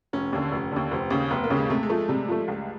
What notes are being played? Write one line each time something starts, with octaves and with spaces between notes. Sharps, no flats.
F1 C#4
D#2 D3
F1
D#2 D3
F1 C4
D#2 C#3
F1 B3
A#3
D#2 C#3
G#3
C3 A3
G#3
F3 A3
C3 G3
F3 A3
C#2